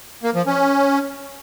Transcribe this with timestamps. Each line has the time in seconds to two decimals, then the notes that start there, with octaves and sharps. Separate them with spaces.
0.23 A#3
0.35 F3
0.46 C#4